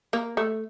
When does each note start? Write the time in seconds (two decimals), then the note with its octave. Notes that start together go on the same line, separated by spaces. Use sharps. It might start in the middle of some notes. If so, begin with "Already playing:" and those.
0.13 A#3
0.37 A3